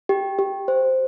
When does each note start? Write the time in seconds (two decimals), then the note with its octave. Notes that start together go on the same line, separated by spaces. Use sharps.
0.09 G4
0.39 G4
0.68 C5